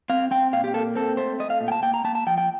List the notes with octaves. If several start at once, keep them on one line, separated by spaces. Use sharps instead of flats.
C4 F5
C4 G5
A#2 F5
G4
A#3 A4
C4 A4
A3 C5
A3 D#5
F5
A#2
G5
A5
A#3 G5
A#5
A#3 A5
A5
F3 G5
G5